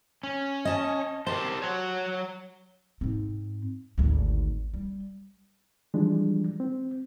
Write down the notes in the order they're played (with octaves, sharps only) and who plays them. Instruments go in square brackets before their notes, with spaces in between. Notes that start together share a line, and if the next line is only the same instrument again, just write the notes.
[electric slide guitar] C#4
[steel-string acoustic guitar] D#5 A5
[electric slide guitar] G4 A#4 C5 [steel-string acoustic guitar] A5
[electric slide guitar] F#3 C#5
[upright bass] G#2 C4
G#1 D2
G3
[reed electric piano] E3 F3 G3 G#3 D4
C4